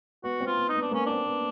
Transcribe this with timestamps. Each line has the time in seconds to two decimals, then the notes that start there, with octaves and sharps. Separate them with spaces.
0.24 B3 F#4
0.41 C4
0.47 F4
0.57 B3
0.69 D#4
0.76 B3
0.82 D4
0.91 A#3 C#4
1.07 C4 D4
1.26 B3